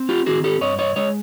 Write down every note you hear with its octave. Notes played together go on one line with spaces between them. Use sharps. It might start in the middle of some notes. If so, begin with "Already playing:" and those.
Already playing: C4
F4 G4
D#3 F#4 G#4
G4 A4
G2 C#5 D#5
C#5 D#5
G#3 C#5 D#5